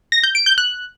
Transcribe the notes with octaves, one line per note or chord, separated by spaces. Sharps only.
A#6
G6
D7
G6
F#6